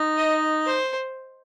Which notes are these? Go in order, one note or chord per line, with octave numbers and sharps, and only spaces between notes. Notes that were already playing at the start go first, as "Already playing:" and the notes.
Already playing: D#4
D#5
C5